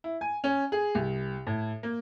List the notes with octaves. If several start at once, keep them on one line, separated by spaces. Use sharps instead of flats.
E4
G#5
C#4
G#4
C2
A2
A#3